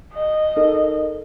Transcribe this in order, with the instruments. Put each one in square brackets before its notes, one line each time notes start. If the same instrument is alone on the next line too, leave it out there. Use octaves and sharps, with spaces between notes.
[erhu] D#5
[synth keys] D#4 A4 A#4